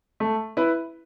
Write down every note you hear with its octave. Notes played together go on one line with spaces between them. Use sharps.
A3
E4 B4